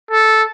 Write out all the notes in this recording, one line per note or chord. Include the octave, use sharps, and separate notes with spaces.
A4